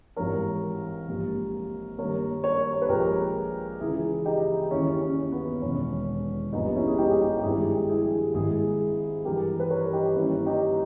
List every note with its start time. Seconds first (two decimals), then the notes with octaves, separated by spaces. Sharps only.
0.16 G#1 G#2 E3 G3 A#4 C#5
1.08 A#1 G#2 G3 A#3
1.98 G2 D#3 A#3 A#4 C#5
2.44 A#4 C#5
2.73 C#5
2.82 B4
2.89 A#1 A#2 G#3 G4 A#4
3.80 C#2 C#3 E3 E4 G#4
4.25 D#4 G4
4.71 D#2 D#3 G3 A#3 C#4 E4
5.01 C#4
5.32 B3
5.62 E1 E2 D#3 C#4
6.53 A#1 G#2 G3 B3 D#4
6.75 C#4 E4
6.87 G#4
6.98 D#4 G4
7.10 G#4
7.21 D#4 G4
7.39 G4
7.43 G#1 G2 D#3 E4 G#4
7.89 E4 G#4
8.34 G#1 G#2 D#3 G#3 E4 G#4
9.25 G2 E3 G3 G4 A#4
9.60 B4
9.70 A#4 C#5
9.93 D#4 G4
10.16 G2 D#3 G3 A#3 C#4 E4
10.46 D#4 G4